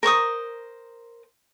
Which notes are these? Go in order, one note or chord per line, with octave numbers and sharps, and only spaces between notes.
A#4 C5 C#6 D#6